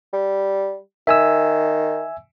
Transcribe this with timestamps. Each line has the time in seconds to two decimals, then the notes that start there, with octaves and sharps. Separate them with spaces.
0.13 G3
1.07 D#3 E5 G#5 E6